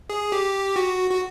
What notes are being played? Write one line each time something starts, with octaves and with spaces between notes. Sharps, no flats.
G#4
G4
F#4
F#4